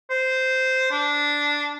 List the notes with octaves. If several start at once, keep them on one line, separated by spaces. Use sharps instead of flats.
C5
D4